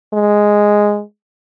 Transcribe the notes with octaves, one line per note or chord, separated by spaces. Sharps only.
G#3